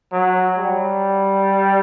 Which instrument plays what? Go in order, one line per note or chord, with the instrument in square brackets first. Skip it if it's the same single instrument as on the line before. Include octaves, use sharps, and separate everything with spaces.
[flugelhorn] F#3
G3